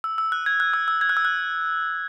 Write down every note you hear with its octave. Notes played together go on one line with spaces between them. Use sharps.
E6
E6
F#6
G#6
F#6
E6
E6
G#6
F#6
E6
F#6